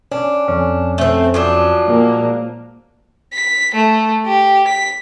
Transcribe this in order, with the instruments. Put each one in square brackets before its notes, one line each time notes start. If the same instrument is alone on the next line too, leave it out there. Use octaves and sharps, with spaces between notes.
[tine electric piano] C#4 [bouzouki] D4
[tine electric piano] F2 C#4
[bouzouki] A3 C4
F3 F#3 D4
[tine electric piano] A#2 G#3 [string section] A#3
[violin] B6
A3
G4
B6